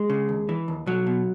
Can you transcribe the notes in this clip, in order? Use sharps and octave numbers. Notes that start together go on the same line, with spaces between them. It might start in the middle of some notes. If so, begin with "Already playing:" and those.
Already playing: G#3
C#3
D#2
E3
D#2
B1 F#3
B2